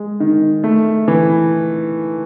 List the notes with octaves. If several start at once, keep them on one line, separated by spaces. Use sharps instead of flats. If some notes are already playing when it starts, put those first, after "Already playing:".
Already playing: G#3
D#3
A3
E3